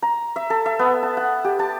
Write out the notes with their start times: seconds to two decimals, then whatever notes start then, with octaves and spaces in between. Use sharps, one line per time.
0.02 A#5
0.36 E5
0.50 A4
0.66 E5
0.79 B3
1.03 A5
1.17 F#5
1.44 G4
1.59 A5